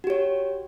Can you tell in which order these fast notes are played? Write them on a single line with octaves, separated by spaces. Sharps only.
F#4 G4 C#5